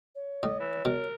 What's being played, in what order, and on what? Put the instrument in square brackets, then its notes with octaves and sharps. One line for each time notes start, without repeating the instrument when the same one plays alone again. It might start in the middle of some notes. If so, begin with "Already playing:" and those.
[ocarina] C#5
[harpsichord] A2 [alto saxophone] D#5
[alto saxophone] E3
[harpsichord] B2 [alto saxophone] A#4